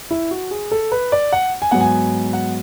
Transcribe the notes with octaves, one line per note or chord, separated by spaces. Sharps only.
E4
F#4
G#4
A4
B4
D5
F#5
G#5
G#2 F#3 B3 F#5
G#5
F#5